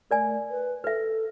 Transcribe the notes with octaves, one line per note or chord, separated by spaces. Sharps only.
A3 A#4 D5 G#5
B4
A4 B4 E5